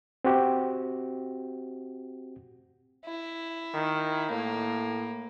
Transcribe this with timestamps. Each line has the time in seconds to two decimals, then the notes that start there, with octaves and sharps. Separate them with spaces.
0.25 C4 F#4 G4
3.06 E4
3.74 D#3
4.31 A2 A#3